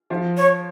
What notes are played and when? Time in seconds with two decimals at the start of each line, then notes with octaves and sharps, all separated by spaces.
0.10 F3
0.37 C#5